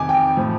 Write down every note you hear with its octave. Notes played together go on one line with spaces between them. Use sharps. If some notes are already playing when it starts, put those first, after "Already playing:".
Already playing: F2 C3 D#3 G#5 D6
G5
A2 F3